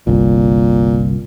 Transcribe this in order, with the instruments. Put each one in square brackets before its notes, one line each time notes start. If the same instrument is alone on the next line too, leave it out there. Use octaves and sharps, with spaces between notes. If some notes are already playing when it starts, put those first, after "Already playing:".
[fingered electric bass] G1 C2 [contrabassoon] A#2